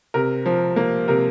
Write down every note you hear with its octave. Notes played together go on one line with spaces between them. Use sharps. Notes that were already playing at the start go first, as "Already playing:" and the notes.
C3 A#4
F3
A#3
C3 A#4